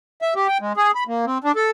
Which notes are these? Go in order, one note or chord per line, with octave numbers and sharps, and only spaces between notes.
E5
G4
G5
G#3
G#4
B5
A#3
C4
D4
A4